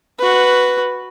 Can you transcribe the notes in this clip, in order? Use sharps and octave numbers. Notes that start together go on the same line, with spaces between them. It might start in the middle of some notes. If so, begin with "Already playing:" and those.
F#4 B4